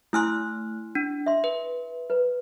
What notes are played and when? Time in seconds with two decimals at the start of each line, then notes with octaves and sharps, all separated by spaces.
0.13 A3 E4 G#5 C6 F6 F#6
0.95 D4
1.26 E5 C6
1.44 B4
2.10 B4